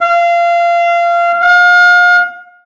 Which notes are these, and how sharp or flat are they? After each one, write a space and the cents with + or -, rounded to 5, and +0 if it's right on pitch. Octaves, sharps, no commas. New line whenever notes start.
F5 -25
F5 +35